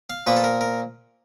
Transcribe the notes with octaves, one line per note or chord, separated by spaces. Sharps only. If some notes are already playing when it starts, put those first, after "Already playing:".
F5
A#2 F3 A#3 B4
A4
A#4
A#4